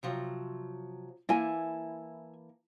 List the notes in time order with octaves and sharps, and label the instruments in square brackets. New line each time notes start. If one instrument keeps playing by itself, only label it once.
[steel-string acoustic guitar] C3 F3 F#3
[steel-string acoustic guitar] E3 A#3 A5 [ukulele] E4 G#5